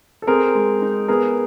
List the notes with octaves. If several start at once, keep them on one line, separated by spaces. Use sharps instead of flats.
A4
C4 G#4 A#4
G#3
D#4
B3 G#4 A#4